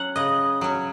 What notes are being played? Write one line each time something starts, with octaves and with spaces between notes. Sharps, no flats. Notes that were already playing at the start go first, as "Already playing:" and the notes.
Already playing: F#3 C#4 F#5
C#3 D#5
F#3 C#4